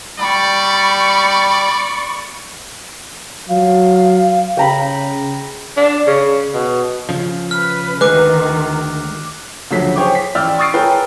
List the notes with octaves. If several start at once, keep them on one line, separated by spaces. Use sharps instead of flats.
G3 D5 B5 C#6
F#3 F5
C#3 G5 A#5 B5
D4
C#3
B2
C#3 F3
B4 F6
D2 D#3 G#3 B4 D6 F#6
D2 C#3 F3 F#3 C#4 B6
G#4 C5 C#5 G5 D6
B6
A1 D5 G5 E6 F6
C#6 D#6 E6 A6 C7 D7
G#4 A#4 B4 C#5 G5